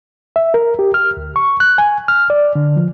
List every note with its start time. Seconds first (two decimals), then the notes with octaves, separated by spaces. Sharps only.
0.36 E5
0.54 A#4
0.79 G4
0.94 F6
1.17 D2
1.36 C#6
1.60 F#6
1.78 G#5
2.08 F6
2.30 D5
2.55 D3
2.76 F3